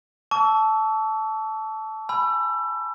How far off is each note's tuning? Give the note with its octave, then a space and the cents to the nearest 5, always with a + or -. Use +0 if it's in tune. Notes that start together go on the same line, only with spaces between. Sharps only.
A5 -10 C#6 +40 E6 -5
G#5 +0 B5 +0 E6 +25